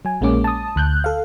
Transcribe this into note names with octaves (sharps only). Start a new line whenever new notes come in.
F#3 G#5
A#1 G#3 A#3 C#4 D6
A5 D#6
D2 F#6 G6
A4 F5